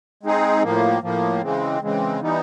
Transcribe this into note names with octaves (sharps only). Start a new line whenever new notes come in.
G#3 C4 D#4 G#4
A2 F3 A#3
A2 F3 A#3
C#3 E3 G#3 C4
C#3 E3 G#3 C4
E3 G3 B3 D#4